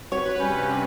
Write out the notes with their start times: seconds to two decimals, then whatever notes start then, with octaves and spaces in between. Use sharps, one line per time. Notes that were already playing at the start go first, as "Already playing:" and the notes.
0.12 G3 C4 F#4 B4 C#5
0.40 G2 C3 G3 C#4 G6